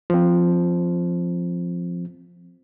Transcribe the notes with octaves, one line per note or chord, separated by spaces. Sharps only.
F3 C4